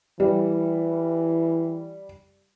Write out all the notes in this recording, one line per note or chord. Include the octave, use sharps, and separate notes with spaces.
E3 G3